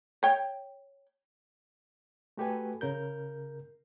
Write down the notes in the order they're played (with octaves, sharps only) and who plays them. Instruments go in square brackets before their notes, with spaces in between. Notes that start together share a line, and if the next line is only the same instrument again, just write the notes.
[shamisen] C#5 G5
[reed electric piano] A3 F#4 G4 A4 B4 G#5
C#3 A#4 G6